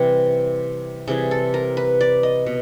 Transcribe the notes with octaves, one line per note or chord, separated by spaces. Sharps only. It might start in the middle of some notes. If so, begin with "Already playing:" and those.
Already playing: C3 E3 G3 G4
C3 E3 G3 G#4
A4
A#4
B4
D5
D#5
B2